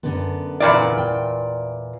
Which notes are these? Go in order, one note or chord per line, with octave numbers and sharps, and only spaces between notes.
F#2 D3 B3
E2 A#2 D5
G5